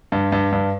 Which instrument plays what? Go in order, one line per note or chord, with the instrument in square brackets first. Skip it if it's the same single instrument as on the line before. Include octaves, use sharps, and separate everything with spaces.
[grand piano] G2
G2
G2